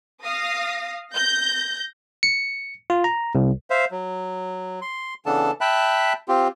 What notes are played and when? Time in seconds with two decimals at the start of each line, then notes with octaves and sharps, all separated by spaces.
0.23 F5 D#6 A#6
1.15 G6 A#6
2.23 C#7
2.90 F4
3.04 A#5
3.35 C2
3.70 C5 E5 F5
3.91 F#3
4.82 C6
5.26 C#3 E3 B3 D4 A4 A5
5.61 E5 G5 A5 B5 F#6
6.28 C4 F4 G4